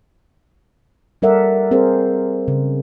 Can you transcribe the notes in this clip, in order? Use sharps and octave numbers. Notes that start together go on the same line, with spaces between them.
G3 A4 A#4 D5 E5 F#5
C4 G#4 A#4 C5
C#3